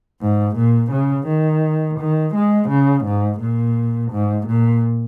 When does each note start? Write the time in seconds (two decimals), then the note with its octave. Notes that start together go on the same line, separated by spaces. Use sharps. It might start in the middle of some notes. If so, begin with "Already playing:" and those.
0.22 G#2
0.56 A#2
0.92 C#3
1.27 D#3
1.99 D#3
2.35 G#3
2.69 C#3
3.05 G#2
3.41 A#2
4.12 G#2
4.47 A#2